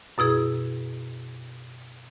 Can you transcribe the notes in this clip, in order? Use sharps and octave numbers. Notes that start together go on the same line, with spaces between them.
F#2 B2 E4 G#4